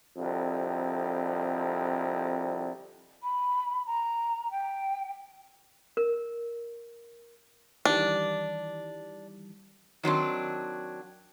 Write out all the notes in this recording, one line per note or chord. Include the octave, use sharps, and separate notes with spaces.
C2 F2 D3
B5
A#5
G5
A#4
D#3 E3 G3 D4
D#3 F#3 C4 D4